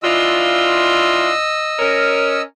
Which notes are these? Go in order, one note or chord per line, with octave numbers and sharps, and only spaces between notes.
E3 D4 F4 D#5 E6
C#4 A#4